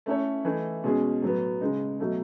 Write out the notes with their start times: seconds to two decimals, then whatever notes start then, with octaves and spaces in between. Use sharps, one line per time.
0.06 A3 C#4 E4 A4 C#5
0.44 E3 A3 D#4
0.84 B2 G#3 C#4 G#4
1.22 A2 F#3 B3
1.61 C#3 G#3 D#4
2.00 B2 F#3 A3 D#4